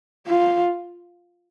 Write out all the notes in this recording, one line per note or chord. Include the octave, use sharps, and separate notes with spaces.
F4